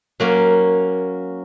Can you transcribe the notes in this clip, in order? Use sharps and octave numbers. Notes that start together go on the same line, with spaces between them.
F#3 A#3 C#4